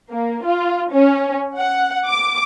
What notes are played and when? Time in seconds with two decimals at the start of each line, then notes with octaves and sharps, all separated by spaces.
0.11 A#3
0.46 F4
0.93 C#4
1.57 F#5
2.06 D6